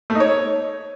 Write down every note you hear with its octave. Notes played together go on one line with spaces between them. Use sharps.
A3
D#4
C#5